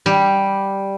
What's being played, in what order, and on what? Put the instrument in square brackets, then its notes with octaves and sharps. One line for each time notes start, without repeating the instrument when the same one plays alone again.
[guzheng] G3